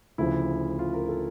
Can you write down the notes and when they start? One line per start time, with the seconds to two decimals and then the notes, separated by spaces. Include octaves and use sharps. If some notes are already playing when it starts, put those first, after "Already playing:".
0.18 D2 C#3 F3 E4
0.79 F4
0.93 A#4
1.08 A4